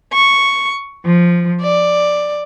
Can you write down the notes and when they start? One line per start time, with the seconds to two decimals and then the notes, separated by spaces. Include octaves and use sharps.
0.13 C#6
1.04 F3
1.61 D5